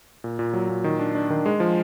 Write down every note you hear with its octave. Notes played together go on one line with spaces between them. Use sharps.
A#2
A#2
F#3
A#2
D#3
D4
D4
D#3
G#3
F3